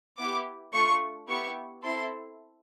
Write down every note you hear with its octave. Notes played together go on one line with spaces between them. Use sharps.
B3 E4 G4 D6
A3 D4 F4 C#6
B3 E4 G4 C#6
C4 E4 A4 C6